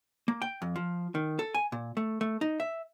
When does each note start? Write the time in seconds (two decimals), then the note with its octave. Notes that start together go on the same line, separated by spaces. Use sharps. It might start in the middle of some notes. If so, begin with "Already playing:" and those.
0.28 A#3
0.42 G5
0.62 F2
0.76 F3
1.15 D#3
1.39 A4
1.55 G#5
1.72 A#2
1.97 A3
2.21 A3
2.41 D#4
2.60 E5